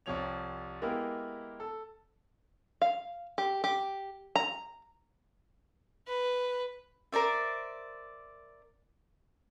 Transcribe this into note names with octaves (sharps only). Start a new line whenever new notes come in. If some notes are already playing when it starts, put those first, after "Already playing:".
C2 C3 F3 C#5 F7
G#3 A#3 B3 E4 G4 A#4
A4
F5
G4
G4
A#5
B4
A#4 C5 D5 E5